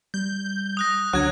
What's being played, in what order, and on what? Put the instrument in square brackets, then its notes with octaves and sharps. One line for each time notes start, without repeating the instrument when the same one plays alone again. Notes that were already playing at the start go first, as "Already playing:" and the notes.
[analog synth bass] G3 [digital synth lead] G6
[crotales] D#6 F#6 A#6
[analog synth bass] C#2 [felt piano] D3 [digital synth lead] F#3 [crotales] F#6 G#6